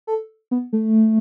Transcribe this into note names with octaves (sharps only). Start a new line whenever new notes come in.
A4
B3
A3